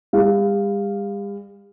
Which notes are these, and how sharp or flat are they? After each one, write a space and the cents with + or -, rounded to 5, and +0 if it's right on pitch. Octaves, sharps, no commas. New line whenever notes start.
G3 +45 F5 +0